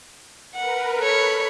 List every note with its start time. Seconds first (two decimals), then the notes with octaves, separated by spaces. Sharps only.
0.55 A#4 B4 F#5
0.98 A4 C#5 B5 B6